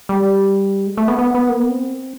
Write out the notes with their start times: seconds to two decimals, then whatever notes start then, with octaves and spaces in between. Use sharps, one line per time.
0.09 G3
0.87 G#3
0.97 A3
1.08 B3
1.18 B3
1.35 B3
1.49 A#3
1.59 B3
1.70 C4